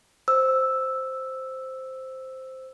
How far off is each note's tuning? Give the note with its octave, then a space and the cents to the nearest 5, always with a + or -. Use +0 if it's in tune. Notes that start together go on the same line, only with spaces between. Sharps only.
C5 +0 E6 +0